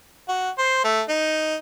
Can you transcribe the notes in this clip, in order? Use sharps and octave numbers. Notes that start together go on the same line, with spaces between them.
F#4
C5
A3
D#4